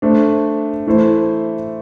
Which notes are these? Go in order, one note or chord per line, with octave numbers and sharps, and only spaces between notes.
A3 D4 C5
E3 A3 E4 C5